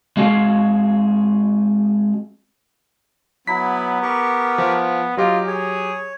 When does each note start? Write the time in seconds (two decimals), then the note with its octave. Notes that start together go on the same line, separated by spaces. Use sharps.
0.17 G#3 C4 F#4 G#4 F5
3.47 F#3 B3 E4 B6
4.03 G4 A#4 C#6
4.58 F3
5.17 F#3 F4 G4 D#5
5.47 G#4 C#5